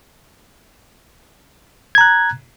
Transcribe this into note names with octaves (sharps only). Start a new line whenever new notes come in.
A#5 F#6 G#6